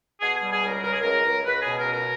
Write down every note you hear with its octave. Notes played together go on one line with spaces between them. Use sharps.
B2 G#4
G3 G#4
G#4
C#2 A#4
C#2 A#4
G#4
C#2 A#4
C#2
C#2 B4
G#4
B2
A#4
C#2
A#4